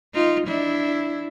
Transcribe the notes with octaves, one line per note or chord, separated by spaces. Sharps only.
D#4 F4
D4 E4